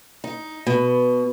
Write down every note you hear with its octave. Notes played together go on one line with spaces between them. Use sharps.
D#4
B2